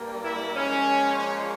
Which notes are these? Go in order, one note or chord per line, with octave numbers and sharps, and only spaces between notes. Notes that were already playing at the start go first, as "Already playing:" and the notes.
Already playing: G2 G3 A#3
E4
A#2 F3 G#3 C#4
C#4